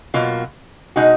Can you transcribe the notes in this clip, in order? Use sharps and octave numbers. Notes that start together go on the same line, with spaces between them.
B2 F#3 A#3 F4
B2 G#3 D#4 F#4